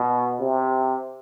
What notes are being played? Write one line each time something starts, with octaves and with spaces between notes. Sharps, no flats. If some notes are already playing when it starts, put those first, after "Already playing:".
Already playing: B2
C3